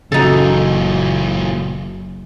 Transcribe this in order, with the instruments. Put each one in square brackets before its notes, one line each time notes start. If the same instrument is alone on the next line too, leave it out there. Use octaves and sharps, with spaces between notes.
[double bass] F#1 [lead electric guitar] A#2 E3 [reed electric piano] C#3 F#4 [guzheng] D#4 A4